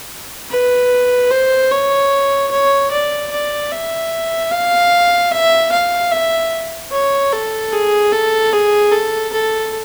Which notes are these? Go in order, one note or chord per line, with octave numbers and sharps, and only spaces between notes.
B4
C5
C#5
C#5
D5
D5
E5
F5
E5
F5
E5
C#5
A4
G#4
A4
G#4
A4
A4